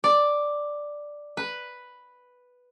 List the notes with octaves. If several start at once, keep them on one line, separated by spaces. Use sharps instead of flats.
D5
B4